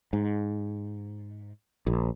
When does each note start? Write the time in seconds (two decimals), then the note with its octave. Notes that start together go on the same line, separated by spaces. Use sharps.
0.13 G#2
1.87 A#1